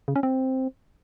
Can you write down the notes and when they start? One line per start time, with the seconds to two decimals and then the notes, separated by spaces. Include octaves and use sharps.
0.08 C#3
0.16 C#4
0.23 C4